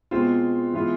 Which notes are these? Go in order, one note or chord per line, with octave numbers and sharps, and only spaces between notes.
B2 G#3 C4 F4
E3 G#3 B3 F4